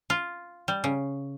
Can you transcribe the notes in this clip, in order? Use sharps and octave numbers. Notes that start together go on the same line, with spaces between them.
F4
G3
C#3